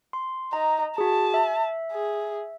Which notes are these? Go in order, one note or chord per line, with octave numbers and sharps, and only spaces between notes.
C6
D#4 A#5
F#4 G#4 A5
E5
G#4